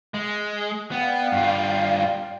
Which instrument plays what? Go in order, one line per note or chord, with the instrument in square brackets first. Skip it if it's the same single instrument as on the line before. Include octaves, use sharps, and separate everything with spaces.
[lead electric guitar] G#3
[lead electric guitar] B3 [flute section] D5 F5 G5
[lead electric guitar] G2 F4